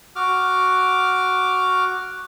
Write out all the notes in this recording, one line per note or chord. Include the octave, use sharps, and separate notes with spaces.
F#4 D6 F6